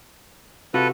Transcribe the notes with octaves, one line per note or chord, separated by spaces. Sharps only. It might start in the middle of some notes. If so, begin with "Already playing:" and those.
C3 F4 F#4 A4 B4